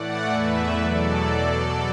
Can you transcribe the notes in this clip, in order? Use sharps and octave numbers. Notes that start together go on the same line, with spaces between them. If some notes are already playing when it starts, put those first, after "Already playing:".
Already playing: A2 E3 A3 D5 F#5
E2 E3 A3 B4 E5
E2 B2 F#3 A4 D5